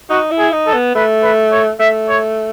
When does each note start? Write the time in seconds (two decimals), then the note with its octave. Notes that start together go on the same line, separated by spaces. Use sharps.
0.10 D#4 F#4
0.31 E4
0.38 G#4
0.52 D#4
0.66 A4
0.74 B3
0.95 A3 B4
1.23 B4
1.51 C#5
1.80 A3 E5
2.09 C#5